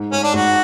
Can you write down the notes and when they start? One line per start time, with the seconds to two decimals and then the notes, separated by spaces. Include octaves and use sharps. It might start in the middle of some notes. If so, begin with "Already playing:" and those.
Already playing: G#2
0.12 G#2 C#4
0.23 D4
0.34 G#2 F#4